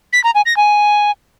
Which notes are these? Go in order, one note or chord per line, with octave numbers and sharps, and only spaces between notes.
B6
A#5
G#5
A#6
G#5